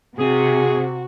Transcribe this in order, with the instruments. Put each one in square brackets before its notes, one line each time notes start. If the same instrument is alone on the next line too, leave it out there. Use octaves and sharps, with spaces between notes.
[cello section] C3 [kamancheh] F#4 [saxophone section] G#4